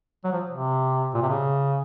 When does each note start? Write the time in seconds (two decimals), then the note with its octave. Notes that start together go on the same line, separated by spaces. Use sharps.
0.24 F#3
0.32 F3
0.50 C3
1.14 A#2
1.22 C3
1.29 C#3